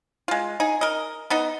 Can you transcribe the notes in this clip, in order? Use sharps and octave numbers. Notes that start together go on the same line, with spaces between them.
G#3 F4
D#4 G#4
A#4 D#5
B3 D#4 D#5